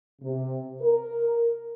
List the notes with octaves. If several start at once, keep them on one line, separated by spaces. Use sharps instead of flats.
C3
A#4